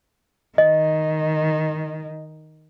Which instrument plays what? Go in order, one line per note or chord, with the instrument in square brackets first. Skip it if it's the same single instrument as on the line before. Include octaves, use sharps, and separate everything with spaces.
[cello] D#3 [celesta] D#5